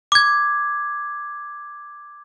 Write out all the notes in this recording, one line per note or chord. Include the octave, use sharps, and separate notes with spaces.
D6 G#6